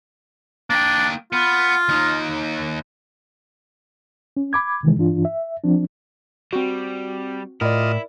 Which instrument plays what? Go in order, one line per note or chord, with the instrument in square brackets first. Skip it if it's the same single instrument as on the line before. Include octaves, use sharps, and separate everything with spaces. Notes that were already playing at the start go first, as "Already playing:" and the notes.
[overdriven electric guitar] A#3 G5 [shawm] D4
[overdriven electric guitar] B3 [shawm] F4
[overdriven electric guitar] D#2 D#4
[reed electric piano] C#4
B5 D6 G#6
C3 D#3 E3 G#3
G2 E3 D4 F4
E5
F3 C4 D4
[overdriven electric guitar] G3 [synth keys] C4 F#4
[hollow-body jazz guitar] A2 [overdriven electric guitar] E4 [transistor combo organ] F4 D#5 [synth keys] A#4 D5